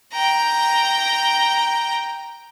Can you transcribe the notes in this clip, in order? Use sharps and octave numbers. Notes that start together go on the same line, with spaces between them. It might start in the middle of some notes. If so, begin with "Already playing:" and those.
G5 A#5